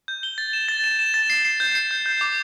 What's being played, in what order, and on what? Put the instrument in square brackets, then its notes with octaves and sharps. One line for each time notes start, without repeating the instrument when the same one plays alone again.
[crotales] G6
G7
A6
E7
A6
E7
E7
A6
C7
C7
G6
C7
G6
G6
D6